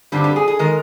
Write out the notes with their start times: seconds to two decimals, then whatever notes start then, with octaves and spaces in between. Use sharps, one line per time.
0.12 G2 D3 G3 C4
0.24 G4
0.36 G#4
0.48 G#4
0.59 D#3 G#3 A#4